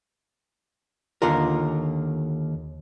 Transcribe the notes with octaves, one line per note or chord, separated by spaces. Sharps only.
D#2 D3 F4 A#4